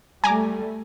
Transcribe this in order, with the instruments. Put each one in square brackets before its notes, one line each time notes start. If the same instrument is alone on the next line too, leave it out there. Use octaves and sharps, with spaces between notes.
[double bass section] G3 A3 [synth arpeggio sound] G#5 A#5 D6